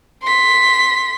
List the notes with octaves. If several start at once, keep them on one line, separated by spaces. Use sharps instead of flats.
C6 B6